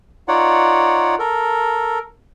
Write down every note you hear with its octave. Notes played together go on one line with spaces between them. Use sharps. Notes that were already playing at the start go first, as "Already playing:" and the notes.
D#4 F4 C#5 D5 F#5
A4 A#4